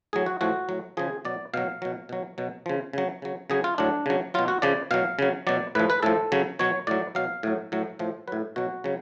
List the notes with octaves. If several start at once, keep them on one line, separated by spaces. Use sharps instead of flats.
A2 F#3 G#4
F#4
A2 F3 F#4
A2 F#3
C#3 F3 G#4
B2 F#3 D5
B2 F#3 F5
B2 F#3
B2 F#3
B2 F#3
C#3 F3
C#3 F#3
C#3 F#3
C#3 F#3 G#4
F4
A2 F#3 D4
C#3 F#3
B2 F#3 F4
F#4
C#3 F3 D5
B2 F#3 F5
C#3 F#3
B2 F#3 D5
A2 F3 B4
B4
A2 F3 A4
C#3 F#3
B2 F#3 C#5
A2 F#3 D5
B2 F#3 F5
A2 F#3
A2 F#3
A2 F3
A2 F#3 B4
B2 F#3 F#4
C#3 F#3